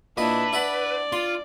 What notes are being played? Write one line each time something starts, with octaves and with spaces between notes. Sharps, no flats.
A#2 D4 E4 B4 D#5
E4 D5 E5 F#5
F4 C6